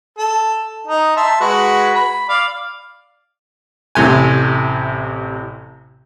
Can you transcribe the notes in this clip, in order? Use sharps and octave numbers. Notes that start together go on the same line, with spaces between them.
A4
D#4
E5 A5 C6
G#3 F#4 B4
B5
D5 F5
A1 A2 C3 G#5